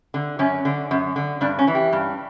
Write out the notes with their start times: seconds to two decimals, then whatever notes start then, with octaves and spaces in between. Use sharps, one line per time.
0.14 D3
0.39 F#2 C#4
0.65 D3
0.91 F#2
1.16 D3
1.41 G2 D4
1.59 C#4
1.67 E3
1.75 G4
1.93 G2